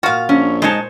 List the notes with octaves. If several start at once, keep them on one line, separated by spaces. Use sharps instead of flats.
A#2 F4 F#4 F5
A#1 C#4
G#3 D#4 C5 C#5 A5